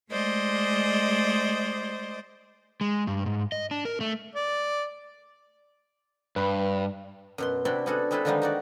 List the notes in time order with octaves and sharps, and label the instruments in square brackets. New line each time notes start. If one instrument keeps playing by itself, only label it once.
[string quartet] G#3 A3 C5 D5 D#5
[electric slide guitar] G#3
G2
G#2
D#5
D4
A#4
A3
[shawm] D5
[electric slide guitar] G2 [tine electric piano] B4 B5
[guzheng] F#2 B2 C6
C3 D4 E4 F#4 D5 C6
B3 C#4 D4 F#4 G#4 A4
G#3 C4 E4 A4 B4 C5
D3 D#3 F3 G3 G#3 D#4
D#4 F#4 D5